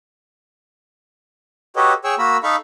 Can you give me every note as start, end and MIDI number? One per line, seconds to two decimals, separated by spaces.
1.76 1.93 66
1.76 1.93 67
1.76 1.93 69
1.76 1.93 71
1.76 1.93 73
1.76 1.93 75
2.04 2.15 68
2.04 2.15 73
2.04 2.15 79
2.04 2.15 85
2.04 2.15 88
2.19 2.37 58
2.19 2.37 66
2.19 2.37 70
2.19 2.37 83
2.19 2.37 88
2.43 2.56 63
2.43 2.56 69
2.43 2.56 77
2.43 2.56 83
2.43 2.56 85